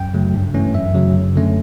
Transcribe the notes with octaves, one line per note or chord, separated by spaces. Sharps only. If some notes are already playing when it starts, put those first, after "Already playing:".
Already playing: F#2 G5
C#3 F#3 A3
G2
E3 A3 C#4
F#2 E5
C#3 F#3
F#2
D3 A3 C#4